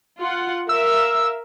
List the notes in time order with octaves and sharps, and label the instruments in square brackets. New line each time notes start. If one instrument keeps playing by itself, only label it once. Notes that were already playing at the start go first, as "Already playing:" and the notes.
[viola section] F4 F#5
[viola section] A#4 E5 F5 [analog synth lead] E6